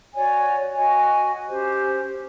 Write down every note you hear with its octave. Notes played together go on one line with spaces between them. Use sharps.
F#4 C#5 D5 G#5
F#4 D#5 G#5
C#4 G4 C5